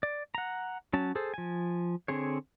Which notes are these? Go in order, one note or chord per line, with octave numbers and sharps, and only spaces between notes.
D5
F#5 A#5
F#3 C#4 A5
G#4 A4 C5
F3 G#5
D3 C4 G#4 C#5